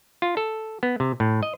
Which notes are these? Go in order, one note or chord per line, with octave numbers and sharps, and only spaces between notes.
F4
A4
B3
C3
A2
D#5